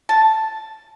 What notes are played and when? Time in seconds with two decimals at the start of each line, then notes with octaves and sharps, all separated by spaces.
0.09 A5